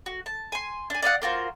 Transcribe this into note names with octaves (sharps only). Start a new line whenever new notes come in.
F#4
A5
G#5 C6
D4 G#5
D5 D#5 F5 F#5
A#3 F4 F#4 C5